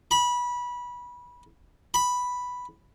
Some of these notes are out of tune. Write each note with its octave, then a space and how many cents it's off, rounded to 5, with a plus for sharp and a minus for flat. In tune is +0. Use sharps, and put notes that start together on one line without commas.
B5 -20
B5 +0